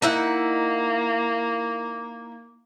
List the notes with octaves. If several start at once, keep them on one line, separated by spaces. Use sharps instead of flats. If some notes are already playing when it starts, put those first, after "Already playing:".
A#3 D#4 E4 F#5